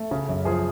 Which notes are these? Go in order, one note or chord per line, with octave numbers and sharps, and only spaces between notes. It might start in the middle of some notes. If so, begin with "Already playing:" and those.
Already playing: A3
C#3
F#2
F3 G#4